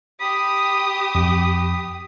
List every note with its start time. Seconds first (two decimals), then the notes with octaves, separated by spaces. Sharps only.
0.20 G4 B5 D#6
1.15 F2